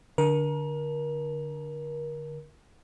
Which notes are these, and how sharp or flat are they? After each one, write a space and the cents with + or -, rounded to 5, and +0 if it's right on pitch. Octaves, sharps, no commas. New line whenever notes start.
D3 +0 A#4 +30